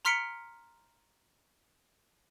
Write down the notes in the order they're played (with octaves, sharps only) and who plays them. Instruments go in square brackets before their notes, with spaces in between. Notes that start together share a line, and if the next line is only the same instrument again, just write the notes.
[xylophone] A#5 C6 F6 B6 C#7 D7